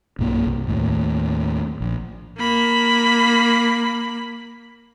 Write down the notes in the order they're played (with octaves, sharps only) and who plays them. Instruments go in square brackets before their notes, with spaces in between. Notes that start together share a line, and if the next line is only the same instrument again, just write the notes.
[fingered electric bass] B1 G2 A#3
C2
D#2 A2
A#1
[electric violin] A#3 B5